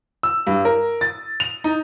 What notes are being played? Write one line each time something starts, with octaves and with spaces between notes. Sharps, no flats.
E6
G2
A#4
A6
F7
D#4